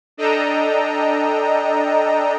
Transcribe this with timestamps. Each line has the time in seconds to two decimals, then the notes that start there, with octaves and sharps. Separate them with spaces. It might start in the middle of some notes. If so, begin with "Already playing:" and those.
0.17 D4 A4 D#5 G5 A#5